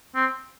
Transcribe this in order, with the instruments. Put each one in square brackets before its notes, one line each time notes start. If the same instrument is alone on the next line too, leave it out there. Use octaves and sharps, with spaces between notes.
[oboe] C4